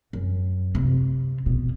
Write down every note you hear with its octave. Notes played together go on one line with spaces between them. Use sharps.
F#2
C3
B2